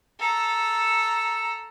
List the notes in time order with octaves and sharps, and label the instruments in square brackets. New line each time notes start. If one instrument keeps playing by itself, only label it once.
[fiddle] A4 A#5